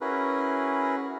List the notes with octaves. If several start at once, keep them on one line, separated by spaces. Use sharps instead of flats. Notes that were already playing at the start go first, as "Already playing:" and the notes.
C#4 E4 F#4 G#4 A#4 B4